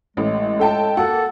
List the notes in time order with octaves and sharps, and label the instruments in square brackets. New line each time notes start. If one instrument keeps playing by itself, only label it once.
[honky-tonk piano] A1 [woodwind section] A2 G#3
[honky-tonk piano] A4 G5 A5
[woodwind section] A#3 [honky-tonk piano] F#4 F#5 [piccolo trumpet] A4